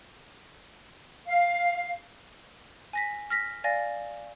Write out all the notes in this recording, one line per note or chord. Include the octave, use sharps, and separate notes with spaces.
F5
G#5 A#6 B6
F6 A#6 B6
D5 F5 G#5 A6 A#6